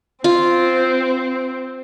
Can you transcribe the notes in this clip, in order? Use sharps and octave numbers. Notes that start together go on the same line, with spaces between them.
C4 F4